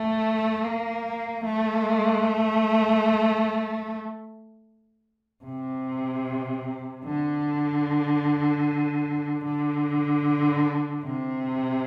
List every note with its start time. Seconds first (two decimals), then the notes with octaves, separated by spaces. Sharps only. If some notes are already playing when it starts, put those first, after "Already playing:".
Already playing: A3
0.65 A#3
1.45 A3
5.44 C3
7.05 D3
9.45 D3
11.04 C3